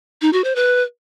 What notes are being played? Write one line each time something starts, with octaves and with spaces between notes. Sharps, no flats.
D#4
F#4
C5
B4